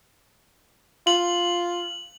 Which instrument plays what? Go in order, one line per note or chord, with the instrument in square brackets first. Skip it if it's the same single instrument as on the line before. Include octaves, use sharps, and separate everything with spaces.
[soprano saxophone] F4 [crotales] F#7